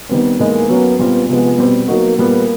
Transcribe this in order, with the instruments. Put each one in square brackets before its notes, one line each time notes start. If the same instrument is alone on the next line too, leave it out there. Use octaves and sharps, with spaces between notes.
[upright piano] D#3 G3 C4 [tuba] B3
[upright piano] A2 E3 G#3 B3 D#4 [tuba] A#3
[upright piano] F#3 A#3 C#4 [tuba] B3
[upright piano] A#2 G3 C4 F4 [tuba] B3
[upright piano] C3 F3 G#3 [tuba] B3
[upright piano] B2 G3 C4
[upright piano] F#3 B3 D#4 F#4 [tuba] A#3
[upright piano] A#2 G3 B3 [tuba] A#3